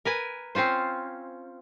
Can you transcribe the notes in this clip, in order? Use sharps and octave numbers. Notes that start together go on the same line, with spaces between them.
A#4 B4 G#5
C4 C#4 F4 C5